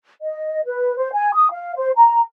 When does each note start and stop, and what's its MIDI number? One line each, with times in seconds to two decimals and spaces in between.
0.21 0.61 75
0.65 0.95 71
0.97 1.09 72
1.13 1.30 80
1.34 1.48 87
1.52 1.72 77
1.76 1.90 72
1.96 2.20 82